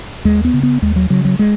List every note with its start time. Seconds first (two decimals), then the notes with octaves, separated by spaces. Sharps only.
0.25 D#2 G#3
0.45 B3
0.53 C#3
0.63 B3
0.82 D#2 G#3
0.96 F#3
1.10 C#3 F#3
1.25 F#3
1.39 G#3